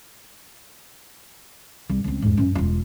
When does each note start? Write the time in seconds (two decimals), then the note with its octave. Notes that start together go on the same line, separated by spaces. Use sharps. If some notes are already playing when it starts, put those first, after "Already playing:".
1.90 C2
2.04 C#2 C4
2.22 E2 G#2
2.37 F#2 C#4
2.55 E1 F4